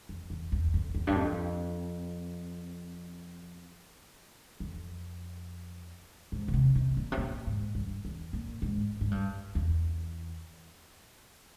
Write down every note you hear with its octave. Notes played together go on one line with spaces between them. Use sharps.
F2
E2
E2
F2
E2
G2
F2
F2
G#2
C#3
C3
C3
A#2
C3
A#2
G#2
G2
E2
A#2
G#2
G#2
G2
E2